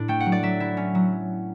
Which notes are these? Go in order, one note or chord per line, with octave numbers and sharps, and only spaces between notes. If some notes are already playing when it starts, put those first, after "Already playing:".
Already playing: A2 D4 E4
A3 G5
F#5
F#3
D5
F#3 E5
E4
C#4
F#3